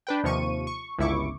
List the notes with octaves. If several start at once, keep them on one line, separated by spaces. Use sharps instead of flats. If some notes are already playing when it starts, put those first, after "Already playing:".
D4 B4 G5
D#2 C3 F3 C#6 D#7
C#6
G1 C#2 E4 C#6 D6